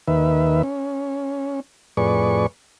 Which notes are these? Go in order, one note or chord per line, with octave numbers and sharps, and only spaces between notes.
D#2 D#3 B4 E5
C#4
F2 A2 G#4 B4 D5 C#6